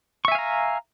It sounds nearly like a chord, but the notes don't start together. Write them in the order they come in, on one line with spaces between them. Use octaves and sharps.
C#6 E5 G#5 F5 A#5